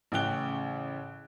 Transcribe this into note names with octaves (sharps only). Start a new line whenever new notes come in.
A1 C#3 G5 F#6 G7